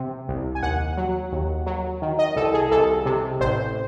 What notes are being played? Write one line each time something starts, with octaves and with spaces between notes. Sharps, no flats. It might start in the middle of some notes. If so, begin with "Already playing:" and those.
Already playing: C3
C2
G#5
D#2 F#5
F#3
D#2
F#3
D#3
D#5
C2 A4
G#4
C2 A4
C3
A1 C5